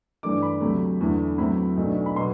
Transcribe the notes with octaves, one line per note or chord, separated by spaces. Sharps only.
G2 E3 A3 D4 D6
B5
D2 C3 F#3 A3
E2 D3 A3 E4
A2 F#3 A3 C4 E4 B5
B1 B2 A3 D4
B5
B2 F#3 B3 C6